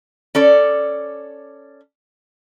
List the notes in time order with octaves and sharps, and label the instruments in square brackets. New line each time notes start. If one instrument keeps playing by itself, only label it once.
[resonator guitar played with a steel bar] C#4 A4 D5